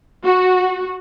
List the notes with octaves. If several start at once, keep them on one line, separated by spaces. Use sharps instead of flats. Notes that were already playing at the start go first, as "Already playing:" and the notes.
F#4